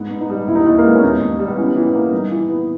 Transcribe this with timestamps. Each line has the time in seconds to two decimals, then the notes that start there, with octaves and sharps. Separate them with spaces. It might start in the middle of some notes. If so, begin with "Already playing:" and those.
Already playing: G#2 B3
0.11 G#2
0.21 D#4
0.30 G3
0.47 D#2 E4
0.55 D#4
0.62 D#2 E4
0.78 A#3
0.85 G#3 B3
0.95 C#4
1.03 D#2 D#4
1.21 D#2
1.39 G3
1.48 B3
1.57 E3 C#4
1.76 E3
1.85 B3
1.94 A#3
2.12 G3 D#4
2.31 E3
2.49 B3